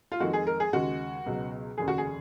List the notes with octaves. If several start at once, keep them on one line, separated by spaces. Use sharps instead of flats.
F4
F2 D#3 G#3 F#4
G#4
A#4
G#4
D#2 C#3 G#3 F#4
C#2 B2 F#3
F1 D#2 C#3 G#4
F#4
G#4